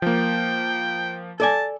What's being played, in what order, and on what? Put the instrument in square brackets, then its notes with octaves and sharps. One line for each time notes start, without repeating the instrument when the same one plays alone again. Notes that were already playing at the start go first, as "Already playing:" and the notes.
[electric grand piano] F3 A#3 [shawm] G5
[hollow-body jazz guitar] A4 D5 G#5 [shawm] A5